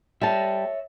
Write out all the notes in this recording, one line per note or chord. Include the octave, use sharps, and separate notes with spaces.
G3 C#5 E5 A5